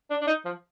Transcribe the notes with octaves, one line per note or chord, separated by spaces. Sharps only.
D4
D4
D#4
F3